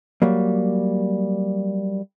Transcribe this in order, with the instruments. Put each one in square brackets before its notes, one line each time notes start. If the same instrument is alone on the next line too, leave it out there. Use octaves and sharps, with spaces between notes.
[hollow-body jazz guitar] F#3 G3 A#3